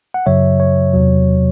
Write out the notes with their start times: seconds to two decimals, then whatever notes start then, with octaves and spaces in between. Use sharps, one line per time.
0.14 F#5
0.26 F#2 C#3 F#3 C#5 E5
0.60 C#5
0.94 E2 C3 F#3